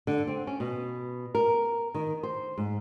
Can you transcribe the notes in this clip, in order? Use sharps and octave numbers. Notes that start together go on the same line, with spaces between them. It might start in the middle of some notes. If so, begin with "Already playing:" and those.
D3
C4
C#4
B2
A#4
D#3
C5
G#2